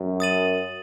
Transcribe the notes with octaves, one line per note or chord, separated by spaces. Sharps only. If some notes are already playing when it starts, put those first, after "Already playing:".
Already playing: F#2
D#6 A6 D#7 F#7